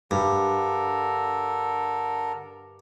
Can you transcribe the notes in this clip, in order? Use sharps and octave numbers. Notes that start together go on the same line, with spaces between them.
G2 D3 A4 A#4